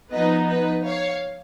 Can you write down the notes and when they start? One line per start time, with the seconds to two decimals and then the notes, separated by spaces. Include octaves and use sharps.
0.12 F3 B3 D#4 B4 D#5
0.48 B4 D#5
0.84 C#5 F5